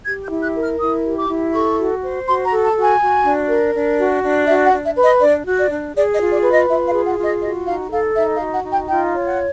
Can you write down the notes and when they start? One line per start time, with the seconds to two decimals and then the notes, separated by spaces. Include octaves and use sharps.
0.06 G4 G#6
0.24 G6
0.31 E4
0.42 F#6
0.55 A#4
0.61 F6
0.80 E4 D#6
1.04 G4
1.17 D6
1.29 E4
1.53 A4 C#6
1.78 F#4
2.03 C5
2.27 F#4 C6
2.46 A#5
2.52 A4
2.64 A5
2.76 F#4
2.82 G#5
3.01 F#4
3.25 D4
3.49 A#4
3.74 D4
3.99 F#4
4.23 D4
4.48 F#4 E5
4.66 F#5
4.73 D4
4.85 E5
4.97 B4
5.03 D#5
5.21 D4 D5
5.45 F#4
5.58 D5
5.71 D4
5.95 G#4 D5
6.13 D#5
6.20 F4
6.32 D5
6.44 B4
6.50 D#5
6.69 F4 E5
6.87 F5
6.93 G#4
7.05 F#5
7.18 F4
7.23 D#5
7.42 F#4 D#5
7.67 D#4 F5
7.91 A4 F5
8.15 D#4 E5
8.35 F5
8.41 F#4
8.53 F#5
8.64 D#4
8.71 G5
8.89 F4 G5
9.14 C#5
9.26 F#5